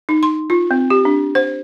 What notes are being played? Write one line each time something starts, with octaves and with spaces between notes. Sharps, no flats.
D#4
C6
F4
C4
G4
D4
C5